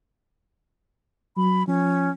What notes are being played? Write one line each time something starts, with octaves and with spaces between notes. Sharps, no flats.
F#3 B5
F3 C#4